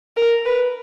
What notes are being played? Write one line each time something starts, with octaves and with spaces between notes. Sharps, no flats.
A#4
B4